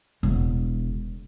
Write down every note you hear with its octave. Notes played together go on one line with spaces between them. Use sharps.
E1